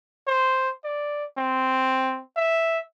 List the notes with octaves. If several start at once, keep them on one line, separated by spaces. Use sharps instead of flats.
C5
D5
C4
E5